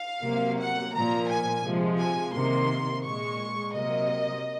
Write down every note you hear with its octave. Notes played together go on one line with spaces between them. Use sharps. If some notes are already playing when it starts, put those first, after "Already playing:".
Already playing: F5
C3 F#3 A#3
F#5
A#2 F3 A#3 A#5
G#5
C3 F3 G#3
G#5
C3 D#3 A#3 C6
A#2 G#3 C#6
C3 F#3 A#3 D#5